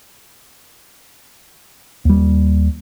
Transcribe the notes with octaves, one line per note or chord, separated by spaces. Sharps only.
D#2 G3